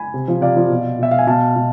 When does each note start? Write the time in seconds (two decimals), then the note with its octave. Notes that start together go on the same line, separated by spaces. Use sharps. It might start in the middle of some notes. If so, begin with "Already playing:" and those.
Already playing: G#5 B5
0.14 C3
0.28 F3
0.41 C3 D5 F5
0.57 F3
0.70 B2
0.99 B2 E5
1.11 F5
1.18 G#5
1.27 B2 F5 A5
1.56 B2